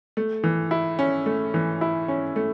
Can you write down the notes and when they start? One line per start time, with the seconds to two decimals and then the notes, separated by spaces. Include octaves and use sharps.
0.17 A3
0.44 E3
0.71 E4
0.99 C#4
1.26 A3
1.54 E3
1.81 E4
2.08 C#4
2.36 A3